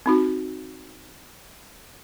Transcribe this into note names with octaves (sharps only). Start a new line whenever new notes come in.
C4 D#4 F#4